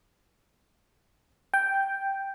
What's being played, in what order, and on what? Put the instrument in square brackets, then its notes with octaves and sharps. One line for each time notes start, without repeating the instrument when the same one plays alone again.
[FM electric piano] G5